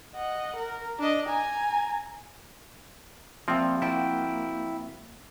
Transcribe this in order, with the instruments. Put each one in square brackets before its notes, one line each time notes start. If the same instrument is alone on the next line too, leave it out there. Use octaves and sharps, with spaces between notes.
[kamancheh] D#5 F#5
A#4
D4 D#5
G#5 A#5
[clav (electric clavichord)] F3 C4 [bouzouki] G3 E5 [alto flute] A#3
[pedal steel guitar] E4 G5 [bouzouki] F#4 A5